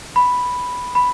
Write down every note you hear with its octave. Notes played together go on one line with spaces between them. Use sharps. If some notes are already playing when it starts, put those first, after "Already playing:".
B5
B5